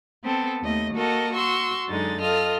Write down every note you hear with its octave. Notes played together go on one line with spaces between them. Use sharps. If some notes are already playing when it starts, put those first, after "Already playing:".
B3 C4 A4
D#2 A3 D#5
A#3 F#4 A4 A#4 D#5
F#4 C6 C#6 E6
F#2 D3 G#3 D#4 A6
F4 A4 D#5 F6